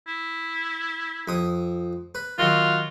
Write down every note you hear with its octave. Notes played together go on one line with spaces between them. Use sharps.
E4
F2 D#6
B4
D#3 F#3 F4 F#4